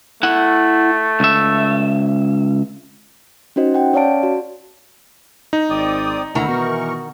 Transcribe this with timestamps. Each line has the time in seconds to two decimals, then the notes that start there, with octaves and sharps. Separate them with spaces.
0.23 A3 E4 F#5
1.20 C#2 E5
3.56 C#4 D#4 F#4 C5 D#5
3.74 F#5 G5
3.93 C#4 C#5 D5 F5 A5 D7
4.23 F#4
5.53 D#4
5.70 G#1 C4 D5 D#6
6.35 D2 D#3 E4 F#4 A#5
6.48 B2 E3 A#4 C#6